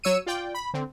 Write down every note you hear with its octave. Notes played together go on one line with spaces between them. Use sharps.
F#3 C#5 E6 C#7 D#7
F4 D5 G5
B5
D3 C4